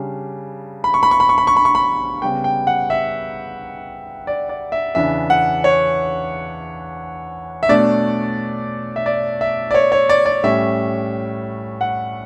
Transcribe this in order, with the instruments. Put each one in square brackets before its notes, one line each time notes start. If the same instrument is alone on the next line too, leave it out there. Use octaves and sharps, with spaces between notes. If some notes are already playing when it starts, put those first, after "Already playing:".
Already playing: [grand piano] C#3 G3 D4
B5
C#6
B5
C#6
B5
C#6
B5
C#6
B5
C#6
B5
C#3 G3 B3 G5
G5
F#5
E5
D5
D5
E5
E2 C#3 E3 B3 D4 E5
F#5
C#5
E5
B2 A3 D4 D5
E5
D5
E5
D5
C#5
C#5
D5
D5
A2 G3 C#4 E5
F#5